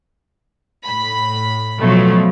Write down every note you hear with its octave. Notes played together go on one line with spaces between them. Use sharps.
A2 B5
B2 F3 F#3 A3